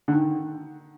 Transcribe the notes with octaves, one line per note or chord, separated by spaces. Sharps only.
D3
D#3